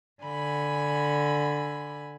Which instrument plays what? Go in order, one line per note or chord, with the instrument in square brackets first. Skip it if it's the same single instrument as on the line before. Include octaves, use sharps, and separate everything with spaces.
[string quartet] D3 G#5 B5